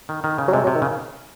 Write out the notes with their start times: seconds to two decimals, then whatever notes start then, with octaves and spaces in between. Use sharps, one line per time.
0.09 D#3
0.24 D#3
0.38 C#3
0.48 F#3
0.53 C3 G#3
0.64 F#3
0.67 C3
0.75 D#3
0.82 C#3